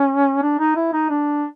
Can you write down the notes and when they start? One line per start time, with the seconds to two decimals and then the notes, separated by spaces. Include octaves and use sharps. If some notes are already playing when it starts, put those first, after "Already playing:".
Already playing: C#4
0.43 D4
0.59 D#4
0.76 E4
0.93 D#4
1.10 D4